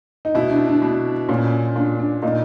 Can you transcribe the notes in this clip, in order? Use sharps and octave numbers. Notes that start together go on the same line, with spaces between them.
D#4
B2 E4
D4
D4
B2
A#2 C#4
A#2 D4
D4
A#2 D#4